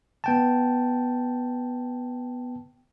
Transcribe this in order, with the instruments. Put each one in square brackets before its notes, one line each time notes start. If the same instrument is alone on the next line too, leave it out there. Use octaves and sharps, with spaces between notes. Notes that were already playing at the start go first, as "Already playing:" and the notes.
[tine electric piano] B3 G5 A5